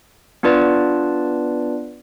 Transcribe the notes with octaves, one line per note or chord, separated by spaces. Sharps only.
B3 D4 F4 B4 D5 A5